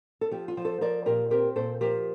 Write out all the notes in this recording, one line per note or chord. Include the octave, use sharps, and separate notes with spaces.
A4
F3 G4
F4
F3
A4 C5
F3 A#4 D5
A#2 G4 A#4
C4 G4 A#4
A#2 A4 C5
F3 G4 A#4